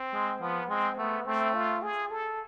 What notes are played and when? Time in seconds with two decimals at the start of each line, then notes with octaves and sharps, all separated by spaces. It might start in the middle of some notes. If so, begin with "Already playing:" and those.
Already playing: C4
0.13 G#3
0.41 F3 B3
0.70 G#3 C4
0.98 A3 B3
1.26 A3 C4
1.55 F4
1.83 G#4
2.11 A4